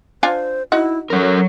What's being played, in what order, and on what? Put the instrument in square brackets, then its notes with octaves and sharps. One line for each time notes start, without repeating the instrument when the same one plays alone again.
[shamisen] D4 F4 G#5 [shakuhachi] C5
[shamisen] D#4 F#4 [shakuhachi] E4
[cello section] F#3 [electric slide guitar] C#4 A#4 [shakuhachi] A4